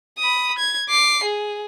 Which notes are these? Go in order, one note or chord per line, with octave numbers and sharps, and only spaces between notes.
B5 D#6
G#6
D6 C7
G#4